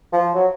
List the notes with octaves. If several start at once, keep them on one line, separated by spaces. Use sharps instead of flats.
F3
F#3